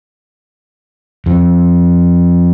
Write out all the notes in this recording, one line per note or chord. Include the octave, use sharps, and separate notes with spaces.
F2